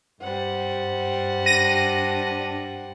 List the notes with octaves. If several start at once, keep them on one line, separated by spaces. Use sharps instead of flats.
G2 G3 C5 F#5
D4 A#6 D#7